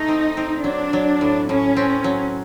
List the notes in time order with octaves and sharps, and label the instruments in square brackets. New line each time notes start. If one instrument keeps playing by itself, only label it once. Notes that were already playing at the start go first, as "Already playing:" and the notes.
Already playing: [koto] A2 A3 [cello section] D#4
[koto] C4
C4
[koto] F#3 [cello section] D4
[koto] F#3
A2
[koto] A2 [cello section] C#4
[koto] C4
F#3